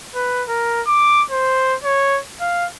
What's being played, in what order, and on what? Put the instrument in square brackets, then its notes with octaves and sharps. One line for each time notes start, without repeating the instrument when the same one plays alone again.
[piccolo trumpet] B4
A#4
D6
C5
C#5
F5